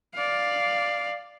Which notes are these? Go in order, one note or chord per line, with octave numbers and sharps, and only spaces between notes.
D5 F5